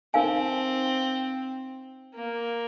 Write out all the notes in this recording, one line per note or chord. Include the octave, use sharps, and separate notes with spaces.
C4 D#4 A#4 F5 G#5
A#3